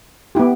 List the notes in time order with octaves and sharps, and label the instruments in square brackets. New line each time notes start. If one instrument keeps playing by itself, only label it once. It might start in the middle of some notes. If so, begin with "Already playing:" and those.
[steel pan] B3 E4 G4